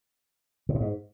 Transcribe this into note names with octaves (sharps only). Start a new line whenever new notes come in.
C3
A#2
G#2